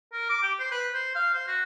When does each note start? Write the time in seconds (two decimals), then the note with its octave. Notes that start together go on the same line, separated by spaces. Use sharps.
0.13 A#4
0.29 D6
0.43 G4
0.60 C5
0.71 B4
0.94 C5
1.15 F5
1.34 C5
1.48 F#4